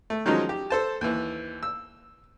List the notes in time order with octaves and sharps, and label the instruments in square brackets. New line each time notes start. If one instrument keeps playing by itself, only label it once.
[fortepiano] A3
D#3 F3 F#3 G#3 C#4 D#4
G4
A4 C5 A5
D#2 E3
E6